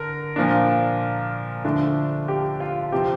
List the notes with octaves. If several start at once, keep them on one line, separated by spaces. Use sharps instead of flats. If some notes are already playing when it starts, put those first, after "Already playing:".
Already playing: D3 A#4
A#2 F3 A#3 D4
D3 F3 A3 D4
G4
F4
C3 F3 C4 G4